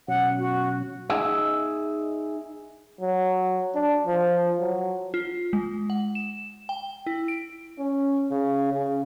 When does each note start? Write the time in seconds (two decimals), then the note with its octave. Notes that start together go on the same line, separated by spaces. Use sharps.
0.08 B2 F#3 C#4 F#5
0.38 F#4
1.10 D#4 G#4 E5
3.01 F#3
3.75 D4
4.07 F3
4.60 F#3
5.14 F4
5.53 G#3
5.90 F#5
6.15 E7
6.69 G5
7.07 E4
7.28 D7
7.79 C#4
8.31 C#3
8.72 C#3